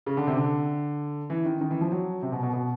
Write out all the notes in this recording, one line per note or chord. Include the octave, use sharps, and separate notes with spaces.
C#3
D3
C3
D3
E3
D#3
D#3
E3
F3
F#3
C3
B2
B2
B2